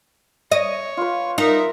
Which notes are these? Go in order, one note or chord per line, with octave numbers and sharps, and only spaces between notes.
C#5 D#5
F4 B4
D#4 A#4 E5